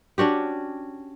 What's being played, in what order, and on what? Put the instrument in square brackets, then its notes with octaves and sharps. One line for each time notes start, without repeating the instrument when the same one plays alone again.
[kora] C#4 D4 F#4 G4